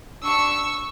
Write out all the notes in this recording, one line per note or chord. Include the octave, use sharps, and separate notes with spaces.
D4 G4 C#6 E6